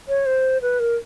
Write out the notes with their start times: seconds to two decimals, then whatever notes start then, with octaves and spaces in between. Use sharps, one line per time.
0.08 C#5
0.26 C5
0.62 B4
0.80 A#4